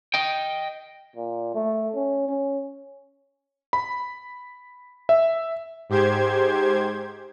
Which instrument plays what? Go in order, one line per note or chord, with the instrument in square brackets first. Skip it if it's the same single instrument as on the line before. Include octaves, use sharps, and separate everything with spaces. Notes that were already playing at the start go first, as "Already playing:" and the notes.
[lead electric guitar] D#5 G5
[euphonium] A#2
A3
C#4
C#4
[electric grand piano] B5
E5
[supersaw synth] G#2 G4 C5 G#6